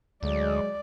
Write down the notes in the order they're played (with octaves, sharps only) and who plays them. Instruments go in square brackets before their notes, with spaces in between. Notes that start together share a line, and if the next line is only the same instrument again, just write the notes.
[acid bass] D2 [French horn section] F#3 G#3 [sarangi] D5